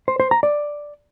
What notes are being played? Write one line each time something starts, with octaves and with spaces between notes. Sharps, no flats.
C5
C5
A#5
D5